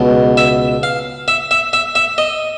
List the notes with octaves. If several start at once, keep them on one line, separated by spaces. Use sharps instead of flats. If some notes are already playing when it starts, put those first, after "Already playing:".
Already playing: C#2 B2
E5
F5
E5
E5
E5
E5
D#5